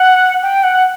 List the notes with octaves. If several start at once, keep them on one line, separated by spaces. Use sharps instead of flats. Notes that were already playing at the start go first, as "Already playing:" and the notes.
Already playing: F#5
G5
F#5